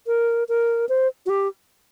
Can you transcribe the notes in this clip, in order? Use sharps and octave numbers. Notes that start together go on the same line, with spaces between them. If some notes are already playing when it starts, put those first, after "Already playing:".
A#4
A#4
C5
F#4
G4